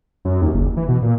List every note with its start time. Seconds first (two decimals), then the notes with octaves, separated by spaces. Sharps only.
0.25 F#2
0.42 D#2
0.54 F#1
0.77 E3
0.88 B2
1.02 A#2